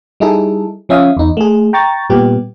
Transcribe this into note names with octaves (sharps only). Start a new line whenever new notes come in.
G3 D#4 E4 G#4 A4
F3 C#4 E5 F5 D#6
E2 D#4
A3 G#4
G5 A#5 C#6 A6
A#2 G3 B3 G4